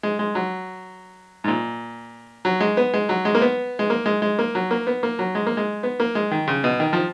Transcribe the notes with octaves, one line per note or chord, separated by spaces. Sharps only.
G#3
G#3
F#3
G#2
A#2
F#3
G#3
B3
G#3
F#3
G#3
A#3
B3
G#3
A#3
G#3
G#3
A#3
F#3
A#3
B3
A#3
F#3
G#3
A#3
G#3
B3
A#3
G#3
D#3
C#3
B2
D#3
F3